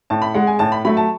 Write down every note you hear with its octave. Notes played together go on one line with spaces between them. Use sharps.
A2 A5
B5
G#3 F#5
G#5
A2 A5
B5
F#3 A3 B5
A5